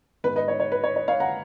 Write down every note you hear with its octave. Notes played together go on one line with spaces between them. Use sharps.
G#2 D#3 G#3 B3 B4
B4 D#5
C#5
C#5
B4
C#5
C#5
C#5 F5
F#5 A#5